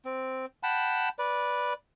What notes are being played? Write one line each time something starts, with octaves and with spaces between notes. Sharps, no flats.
C4
F#5 G5 A5 B5
B4 D5